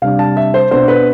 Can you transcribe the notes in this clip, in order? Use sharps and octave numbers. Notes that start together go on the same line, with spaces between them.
C3 G3 D4 F5
A5
E5
C5
B2 B3 D4 C5
B4